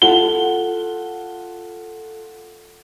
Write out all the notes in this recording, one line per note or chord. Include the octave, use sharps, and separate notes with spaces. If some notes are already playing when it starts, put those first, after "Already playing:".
F4 A4 F#5 G7